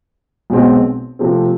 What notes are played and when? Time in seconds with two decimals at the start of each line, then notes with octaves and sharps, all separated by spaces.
0.50 B1 B2 G#3 C4
1.19 C3 F3 A3 C4